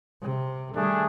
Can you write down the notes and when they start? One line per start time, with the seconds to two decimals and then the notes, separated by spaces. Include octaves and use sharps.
0.22 C3
0.75 D#3 G3 A3 D4 G#4